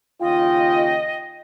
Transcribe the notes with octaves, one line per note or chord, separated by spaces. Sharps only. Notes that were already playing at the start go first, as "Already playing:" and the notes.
D#2 C#3 F4 D#5 G5